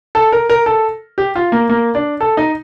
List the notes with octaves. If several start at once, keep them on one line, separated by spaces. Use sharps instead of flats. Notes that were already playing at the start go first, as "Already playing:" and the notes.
A4
A#4
A#4
A4
G4
F4
A#3
A#3
D4
A4
D#4